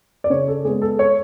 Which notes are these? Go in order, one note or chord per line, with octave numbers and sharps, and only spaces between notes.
D5
C#3 C#5
A4
G#3 B3 G#4
A4
C#5